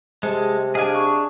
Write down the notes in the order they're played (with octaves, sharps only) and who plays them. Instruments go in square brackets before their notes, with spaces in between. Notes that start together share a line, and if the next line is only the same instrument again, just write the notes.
[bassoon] C3 [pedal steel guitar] G#3 [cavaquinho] A4
[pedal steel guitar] D4 G#4 [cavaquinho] D#5 F5 G#5
[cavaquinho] C#6